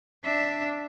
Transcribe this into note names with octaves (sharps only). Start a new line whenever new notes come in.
D4 E5